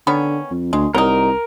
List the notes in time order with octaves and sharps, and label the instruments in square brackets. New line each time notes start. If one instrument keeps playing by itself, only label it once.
[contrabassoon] D3 [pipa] D#3 B3 C#4
[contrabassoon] F2
[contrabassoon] D2 [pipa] G#3
[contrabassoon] C2 [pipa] F#3 D#4 [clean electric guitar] A#4